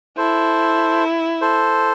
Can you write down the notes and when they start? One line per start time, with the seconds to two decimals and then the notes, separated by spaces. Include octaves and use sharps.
0.17 E4 A4 C5
1.41 A4 C5